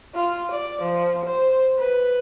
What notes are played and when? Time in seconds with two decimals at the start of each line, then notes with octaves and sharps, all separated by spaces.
0.14 F4
0.52 D5
0.83 F3
1.26 C5
1.78 B4